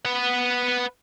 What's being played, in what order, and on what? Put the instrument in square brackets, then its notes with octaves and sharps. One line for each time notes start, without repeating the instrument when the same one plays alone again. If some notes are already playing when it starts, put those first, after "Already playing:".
[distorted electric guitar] B4 F#5